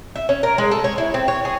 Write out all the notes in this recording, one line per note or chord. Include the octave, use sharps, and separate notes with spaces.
E5
C#4
A#4
G#3
A4
C#5
E4
C4
C#5
G#4